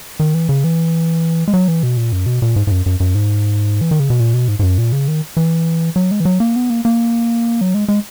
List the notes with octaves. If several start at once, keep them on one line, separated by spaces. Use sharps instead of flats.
D#3
E3
C#3
E3
G#3
F#3
E3
B2
A#2
F#2
B2
A#2
G#2
G#2
F#2
F#2
F#2
G#2
E3
D#3
C#3
B2
A#2
B2
G#2
G#2
F#2
A#2
C#3
D#3
E3
F#3
G#3
E3
F#3
A#3
B3
A#3
A#3
F#3
G#3
G#3